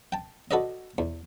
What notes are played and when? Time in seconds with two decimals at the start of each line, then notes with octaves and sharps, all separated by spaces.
0.12 G5 A5
0.51 F#4 A4 B4 D5 D#5
0.98 E2